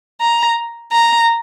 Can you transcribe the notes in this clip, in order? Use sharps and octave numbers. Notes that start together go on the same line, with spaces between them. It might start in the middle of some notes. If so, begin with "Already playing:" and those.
A#5
A#5